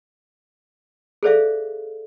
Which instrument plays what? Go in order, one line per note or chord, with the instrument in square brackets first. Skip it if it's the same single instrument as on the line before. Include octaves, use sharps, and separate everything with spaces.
[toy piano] G#4 A4 C5 D5 E5 F5